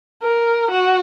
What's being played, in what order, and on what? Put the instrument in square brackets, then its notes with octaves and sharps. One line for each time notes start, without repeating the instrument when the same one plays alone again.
[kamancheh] A#4
F#4